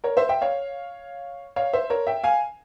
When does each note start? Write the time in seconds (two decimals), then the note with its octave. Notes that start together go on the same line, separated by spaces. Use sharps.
0.04 A#4 C#5
0.17 C5 E5
0.29 E5 G5
0.41 C#5 F5
1.56 C#5 F5
1.73 C5 E5
1.90 A#4 C#5
2.07 E5 G5
2.24 F5 G#5